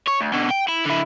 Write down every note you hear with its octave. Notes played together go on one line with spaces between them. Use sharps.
C#5
D2
B2 D3
G5
E4
D3 E4